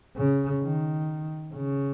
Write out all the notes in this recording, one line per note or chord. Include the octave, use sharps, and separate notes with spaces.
C#3
D#3
C#3